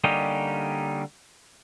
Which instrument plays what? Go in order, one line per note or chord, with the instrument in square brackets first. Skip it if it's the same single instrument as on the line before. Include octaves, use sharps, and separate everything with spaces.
[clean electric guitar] D3 G3 A#3 C#4 D#4 G4